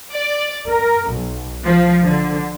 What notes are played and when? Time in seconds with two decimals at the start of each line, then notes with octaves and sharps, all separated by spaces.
0.13 D5
0.68 A#4
1.11 B1
1.65 F3
2.03 D3